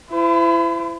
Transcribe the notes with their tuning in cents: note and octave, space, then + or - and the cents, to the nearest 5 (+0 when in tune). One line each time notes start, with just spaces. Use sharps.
E4 +35 C5 -35